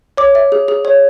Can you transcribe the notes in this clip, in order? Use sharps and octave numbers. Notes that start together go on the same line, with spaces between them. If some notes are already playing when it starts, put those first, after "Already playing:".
C#5 D6
E5
G#4
G#4
C#5